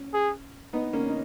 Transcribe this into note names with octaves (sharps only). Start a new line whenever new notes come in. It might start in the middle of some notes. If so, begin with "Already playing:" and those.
Already playing: C#4
G#4
B3 D#4
A#3 C#4
D#4